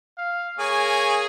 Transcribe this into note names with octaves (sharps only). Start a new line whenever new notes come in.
F5
A#3 G#4 C#5 G#5